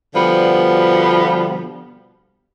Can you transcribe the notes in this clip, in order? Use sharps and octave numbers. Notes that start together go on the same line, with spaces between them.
B2 D3 F3 G3 B3